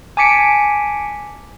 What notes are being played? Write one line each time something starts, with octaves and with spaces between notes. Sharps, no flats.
G#5 A5 D6 B6 C#7 D7